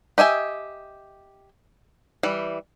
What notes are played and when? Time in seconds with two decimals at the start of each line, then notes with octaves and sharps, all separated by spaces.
0.18 G4 D#5 E5 G#5
2.23 E3 G3